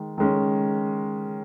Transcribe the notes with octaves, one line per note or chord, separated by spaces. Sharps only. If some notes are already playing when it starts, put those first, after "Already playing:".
Already playing: D#3 G#3
D#3 G#3 C#4